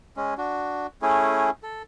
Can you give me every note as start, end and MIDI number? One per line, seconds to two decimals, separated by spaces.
0.17 0.34 56
0.17 0.34 61
0.38 0.87 62
0.38 0.87 66
1.02 1.50 57
1.02 1.50 61
1.02 1.50 64
1.02 1.50 68
1.63 1.82 69